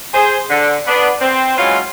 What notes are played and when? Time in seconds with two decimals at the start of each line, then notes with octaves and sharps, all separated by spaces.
0.14 G#4 C5
0.50 D3
0.87 B3 D4
1.21 C4
1.58 E3 F#3 G#3 C#4 F4